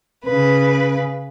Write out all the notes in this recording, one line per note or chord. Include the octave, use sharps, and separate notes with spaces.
C#3 B4